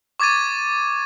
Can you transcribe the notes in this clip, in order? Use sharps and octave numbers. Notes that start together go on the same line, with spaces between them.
C#6 D6 G#6 A6 D#7